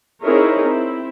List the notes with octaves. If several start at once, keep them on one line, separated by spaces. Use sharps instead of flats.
C4 D#4 E4 G#4 A#4 C#5
C4 E4